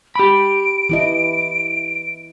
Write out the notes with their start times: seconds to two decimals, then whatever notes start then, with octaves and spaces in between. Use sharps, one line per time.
0.16 G4 B5 D7
0.89 E3 E4 D#5